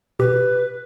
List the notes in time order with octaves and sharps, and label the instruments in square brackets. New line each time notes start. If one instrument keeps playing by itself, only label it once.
[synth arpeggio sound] B2 G4 [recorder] B4